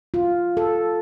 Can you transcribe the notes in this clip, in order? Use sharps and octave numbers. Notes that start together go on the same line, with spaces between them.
F4
A4